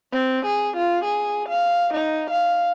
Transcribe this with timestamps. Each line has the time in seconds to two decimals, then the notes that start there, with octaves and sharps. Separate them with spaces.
0.12 C4
0.46 G#4
0.76 F4
1.05 G#4
1.49 F5
1.93 D#4
2.31 F5